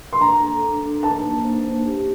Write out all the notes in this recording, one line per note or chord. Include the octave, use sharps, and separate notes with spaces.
C6
D4 A#5
A4
D4
D4
D#4 A5
A#3
C5
D#4
G4